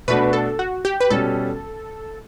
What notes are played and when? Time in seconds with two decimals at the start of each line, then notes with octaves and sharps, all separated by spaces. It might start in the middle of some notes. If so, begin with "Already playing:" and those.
0.08 B2 A3 D4 F#4 B4
0.33 A4
0.59 F#4
0.85 G4
1.00 B4
1.10 B2 G3 C#4 A4